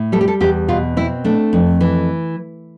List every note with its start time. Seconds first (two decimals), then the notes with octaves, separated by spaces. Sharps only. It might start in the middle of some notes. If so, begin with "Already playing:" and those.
Already playing: A2
0.12 G3 A4
0.21 G4
0.28 A4
0.40 E2 G4
0.68 B2 F4
0.97 C4 E4
1.24 A3 D4
1.53 F2
1.81 E3